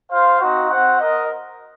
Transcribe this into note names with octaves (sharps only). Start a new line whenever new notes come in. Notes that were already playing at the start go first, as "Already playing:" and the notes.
F4 C5 F5
C4 D#4 F#4
C4 F#4 C5 F#5
A#4 D#5